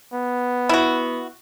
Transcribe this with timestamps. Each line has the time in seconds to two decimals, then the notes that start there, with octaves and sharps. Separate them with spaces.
0.14 B3
0.69 E4 F#4